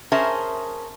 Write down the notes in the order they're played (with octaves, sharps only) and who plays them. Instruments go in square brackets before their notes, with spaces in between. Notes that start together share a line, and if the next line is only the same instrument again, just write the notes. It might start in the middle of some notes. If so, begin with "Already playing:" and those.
[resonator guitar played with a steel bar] C#4 G#4 A#4 C5 E5 A5